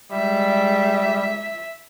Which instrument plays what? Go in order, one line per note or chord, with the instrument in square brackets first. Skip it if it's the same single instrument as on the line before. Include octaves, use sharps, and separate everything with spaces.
[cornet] G3 [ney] G#3 [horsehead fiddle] E5